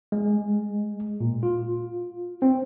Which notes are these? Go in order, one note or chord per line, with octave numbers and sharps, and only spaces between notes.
G#3
A#2
F4
C4